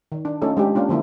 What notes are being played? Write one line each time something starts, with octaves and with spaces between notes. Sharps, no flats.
D#3
D4
A3 C#4 D#4 F4 A4
G#3 D4 G4
A#3 C#4 D4 F4
D3 F3 A#3 E4